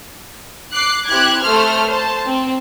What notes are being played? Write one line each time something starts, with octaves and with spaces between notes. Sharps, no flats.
D6 F#6 C7
C4 E4 G4 F#6 G#6
A3 A4 C5 F6
C5 A5
C4